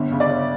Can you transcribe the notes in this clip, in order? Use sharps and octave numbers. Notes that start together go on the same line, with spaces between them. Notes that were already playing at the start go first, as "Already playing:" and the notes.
Already playing: G1 D3
C#3
D5
G1